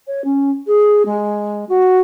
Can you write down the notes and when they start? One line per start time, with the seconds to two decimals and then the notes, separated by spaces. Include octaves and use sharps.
0.07 C#5
0.24 C#4
0.67 G#4
1.05 G#3
1.69 F#4